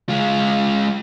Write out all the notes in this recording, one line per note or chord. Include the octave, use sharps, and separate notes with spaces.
G#3 F4